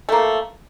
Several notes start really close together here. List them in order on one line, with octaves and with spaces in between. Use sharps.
A3 A#3 F3